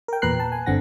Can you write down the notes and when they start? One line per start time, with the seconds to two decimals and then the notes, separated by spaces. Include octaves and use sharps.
0.08 A#4 G5
0.22 E2 A#2 B4 A#5 F#6 C7
0.40 A5
0.52 G#5
0.66 G1 G2 D3 C4 F#5 A#6